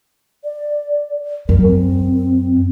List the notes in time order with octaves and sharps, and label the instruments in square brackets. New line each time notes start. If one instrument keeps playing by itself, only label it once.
[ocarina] D5
[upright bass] F#2 [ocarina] A#4
[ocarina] C4